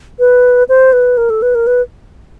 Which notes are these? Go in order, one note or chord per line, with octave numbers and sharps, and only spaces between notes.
B4
C5
B4
A#4
A4
B4
A#4
B4